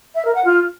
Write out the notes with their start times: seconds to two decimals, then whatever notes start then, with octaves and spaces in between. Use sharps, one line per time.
0.15 E5
0.25 A#4
0.34 F#5
0.44 F4